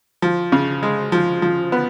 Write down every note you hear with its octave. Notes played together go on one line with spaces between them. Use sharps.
F3
C#3
G#3
F3
F3
B3